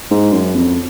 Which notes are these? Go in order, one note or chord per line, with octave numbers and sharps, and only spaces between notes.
G#2
F#2
F2